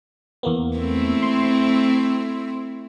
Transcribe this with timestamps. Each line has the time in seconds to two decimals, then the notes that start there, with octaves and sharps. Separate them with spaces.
0.43 E2 A#3 B3
0.77 A3 C4 E4
1.23 C6